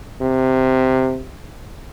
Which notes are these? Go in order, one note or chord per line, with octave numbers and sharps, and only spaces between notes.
C3